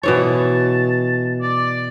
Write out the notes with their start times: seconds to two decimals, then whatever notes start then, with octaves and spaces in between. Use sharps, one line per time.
0.03 B2 E3 C#5 A5
1.41 D5